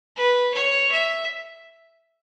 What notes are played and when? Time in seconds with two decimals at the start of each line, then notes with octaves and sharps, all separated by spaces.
0.16 B4
0.54 C#5
0.92 E5